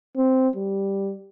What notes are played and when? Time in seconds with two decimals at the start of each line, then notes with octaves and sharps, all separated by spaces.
0.17 C4
0.56 G3